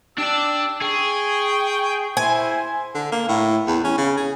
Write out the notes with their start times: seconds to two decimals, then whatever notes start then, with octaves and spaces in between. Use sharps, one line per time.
0.18 D4 G4 D5 E6
0.81 G#4 G5 C#6
2.17 E4 C5 G#5
2.95 D3
3.12 A#3
3.28 A2
3.67 E2
3.84 C#4
3.98 C#3
4.17 G#4